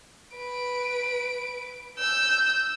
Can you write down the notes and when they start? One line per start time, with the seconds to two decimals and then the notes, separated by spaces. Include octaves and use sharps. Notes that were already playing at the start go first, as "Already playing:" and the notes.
0.35 B4 D7
1.99 E6 G6